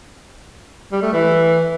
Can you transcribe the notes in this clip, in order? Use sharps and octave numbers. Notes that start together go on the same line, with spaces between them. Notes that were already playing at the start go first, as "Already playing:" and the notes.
G3
A3
E3